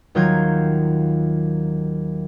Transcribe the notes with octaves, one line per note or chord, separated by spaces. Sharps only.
D#2 D#3 F#3 F4 G6 G#6